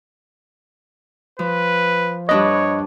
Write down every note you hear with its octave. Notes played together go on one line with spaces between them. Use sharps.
F3 B4
G2 D4 B4 C#5 D#5